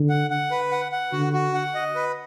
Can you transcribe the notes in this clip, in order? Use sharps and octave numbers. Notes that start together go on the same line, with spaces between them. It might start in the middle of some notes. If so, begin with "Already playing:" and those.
Already playing: D3
F#5
F#5
B4
F#5
F#5
D3 F#4
F#4
F#5
D#5
B4